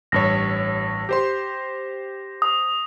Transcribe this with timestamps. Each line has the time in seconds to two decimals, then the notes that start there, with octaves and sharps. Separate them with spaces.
0.12 A1 G2 C#5 A#6
1.09 G4 C5 C6
2.42 D#6